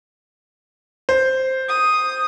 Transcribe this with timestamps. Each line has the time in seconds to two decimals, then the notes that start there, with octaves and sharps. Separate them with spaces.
1.09 C5
1.69 D#6